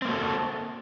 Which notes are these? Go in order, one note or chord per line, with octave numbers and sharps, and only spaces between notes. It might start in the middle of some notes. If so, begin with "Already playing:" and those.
A#3 C4 F#4 A4